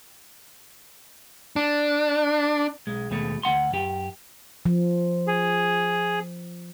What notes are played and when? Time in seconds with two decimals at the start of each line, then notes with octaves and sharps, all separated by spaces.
1.56 D4
2.87 B1 G#3
3.10 D#2 B2 G#3 A3
3.43 D2 A3 F#5 C6
3.72 F#2 G4
4.65 F3
5.28 G#4